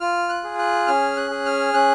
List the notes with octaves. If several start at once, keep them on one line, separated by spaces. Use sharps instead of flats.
F4 F6
F#6
G#4
F#6
C#4 F6
F#6
G#4
F6
C#4 F#6